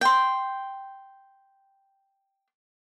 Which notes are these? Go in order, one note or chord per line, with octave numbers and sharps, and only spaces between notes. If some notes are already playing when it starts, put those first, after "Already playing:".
G5 C6